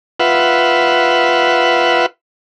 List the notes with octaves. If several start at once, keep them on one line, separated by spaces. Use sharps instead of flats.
F4 B4 E5 F#5